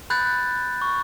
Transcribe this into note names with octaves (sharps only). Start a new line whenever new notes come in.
B5 F#6 G6 A6
C#6